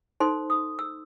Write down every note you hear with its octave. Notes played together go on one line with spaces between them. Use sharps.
D#4 A4 C5 C6
D#6
E6